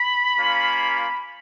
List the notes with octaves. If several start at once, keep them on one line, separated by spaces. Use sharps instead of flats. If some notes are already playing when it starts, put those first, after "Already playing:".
Already playing: B5
A#3 C#4 F4